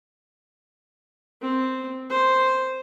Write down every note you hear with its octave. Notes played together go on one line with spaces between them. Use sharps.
C4
C5